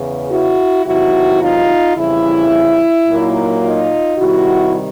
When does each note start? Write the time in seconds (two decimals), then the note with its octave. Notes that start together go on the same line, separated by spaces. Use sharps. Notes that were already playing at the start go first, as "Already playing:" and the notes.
Already playing: E2 C#3 E3
0.31 E4 F#4
0.86 E2 C3 D#3 F#3 E4 F#4
1.42 D#4 F4
1.97 F2 C#3 E3 G3 E4
3.08 A#2 F#3 A#3 D#4
3.63 D#4 F4
4.18 C3 D#3 G3 E4 F#4